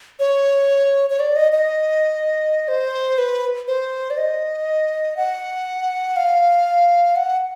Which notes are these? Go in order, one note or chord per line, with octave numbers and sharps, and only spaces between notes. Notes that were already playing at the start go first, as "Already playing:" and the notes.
C#5
C#5
D5
D#5
D#5
C5
B4
C5
D5
D#5
F#5
F5
F#5